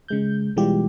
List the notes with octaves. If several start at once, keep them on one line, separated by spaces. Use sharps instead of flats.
C#3 G#3 G6
B2 E3 G3 G#3 F4 G4